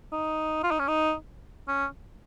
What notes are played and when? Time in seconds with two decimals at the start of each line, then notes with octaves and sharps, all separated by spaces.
0.12 D#4
0.63 F4
0.71 D#4
0.79 C#4
0.88 D#4
1.68 C#4